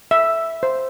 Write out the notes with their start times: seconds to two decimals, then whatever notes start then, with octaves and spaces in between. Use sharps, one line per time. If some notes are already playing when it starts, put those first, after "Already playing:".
0.11 E5
0.63 C5